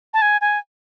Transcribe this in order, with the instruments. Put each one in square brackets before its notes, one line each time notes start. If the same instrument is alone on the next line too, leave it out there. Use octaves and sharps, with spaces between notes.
[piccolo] A5
G#5
G#5